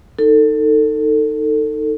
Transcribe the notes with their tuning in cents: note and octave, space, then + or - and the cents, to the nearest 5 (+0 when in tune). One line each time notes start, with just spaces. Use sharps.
D#4 +0 A4 +25